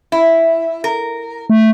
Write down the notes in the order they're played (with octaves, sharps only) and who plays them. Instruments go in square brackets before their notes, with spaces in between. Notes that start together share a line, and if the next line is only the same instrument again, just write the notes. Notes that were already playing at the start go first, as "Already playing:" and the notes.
[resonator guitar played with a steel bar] E4
A#4
[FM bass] A3